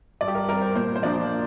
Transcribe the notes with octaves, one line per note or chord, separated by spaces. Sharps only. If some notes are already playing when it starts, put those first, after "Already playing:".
G2 D5
G4
A#4
G3 C4 A#4
C5
A#2 C5
C5
F3 A#3 D4 D5